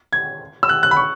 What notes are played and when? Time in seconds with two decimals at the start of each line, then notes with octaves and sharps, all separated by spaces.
0.13 G#6
0.63 E6
0.69 F#6
0.83 F#6
0.91 B5
0.97 C#6